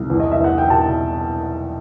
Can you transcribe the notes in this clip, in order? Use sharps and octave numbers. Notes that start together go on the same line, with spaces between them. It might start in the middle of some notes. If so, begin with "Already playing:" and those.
Already playing: C2
E2
D#5
E5
E2 F#5
G5
B2 A5